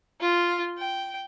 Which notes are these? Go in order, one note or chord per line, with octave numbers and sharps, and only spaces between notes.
F4
G5